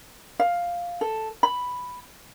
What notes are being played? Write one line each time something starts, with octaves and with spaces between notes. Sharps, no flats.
F5
A4
B5